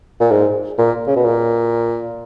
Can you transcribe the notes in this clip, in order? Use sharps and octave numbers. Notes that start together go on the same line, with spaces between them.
A#2
G#2
A#2
C#3
B2
A#2